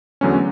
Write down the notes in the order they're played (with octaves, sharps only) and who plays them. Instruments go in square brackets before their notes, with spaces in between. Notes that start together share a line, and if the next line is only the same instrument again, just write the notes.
[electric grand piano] E2 D3 F#3 A3 C#4